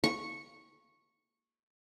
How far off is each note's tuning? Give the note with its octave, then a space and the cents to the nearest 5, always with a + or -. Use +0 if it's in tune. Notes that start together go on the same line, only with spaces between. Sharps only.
C#6 -10